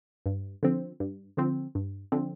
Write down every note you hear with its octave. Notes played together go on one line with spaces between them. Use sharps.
G2
D3 F3 C4
G2
D3 F3 C4
G2
D3 F3 C4